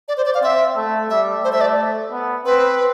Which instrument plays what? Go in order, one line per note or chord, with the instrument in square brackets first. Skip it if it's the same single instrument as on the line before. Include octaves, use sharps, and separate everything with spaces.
[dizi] D5
C5
D5
F5
[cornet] C4 [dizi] E5
[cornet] A3
[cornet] G3 [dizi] E5
[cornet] A3 [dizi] C5
[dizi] E5
D5
[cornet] B3
[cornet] C4 [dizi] B4